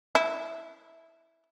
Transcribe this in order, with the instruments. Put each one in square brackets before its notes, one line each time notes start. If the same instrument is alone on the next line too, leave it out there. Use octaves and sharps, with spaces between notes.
[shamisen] E4